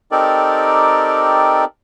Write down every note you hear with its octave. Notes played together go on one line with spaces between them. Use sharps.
C4 D#4 G4 A4 A#4 D5